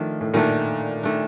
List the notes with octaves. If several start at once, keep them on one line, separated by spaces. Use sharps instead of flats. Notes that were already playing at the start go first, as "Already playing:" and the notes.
Already playing: D#3 F3 A3 D4
A2
A#2 D#3 A3 D4
D#3 A3 D4